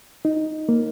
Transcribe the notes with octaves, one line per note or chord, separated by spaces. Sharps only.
D#4
A#3